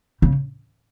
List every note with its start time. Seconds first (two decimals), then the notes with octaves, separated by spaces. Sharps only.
0.22 C#3